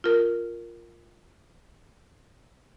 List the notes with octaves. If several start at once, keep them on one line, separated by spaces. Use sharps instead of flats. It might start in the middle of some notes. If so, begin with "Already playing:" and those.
F4 A#4